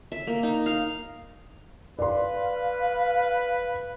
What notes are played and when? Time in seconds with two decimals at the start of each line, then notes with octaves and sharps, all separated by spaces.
0.12 E5
0.27 A#3
0.43 D#4
0.66 F5
1.99 B4 D5 F5 C6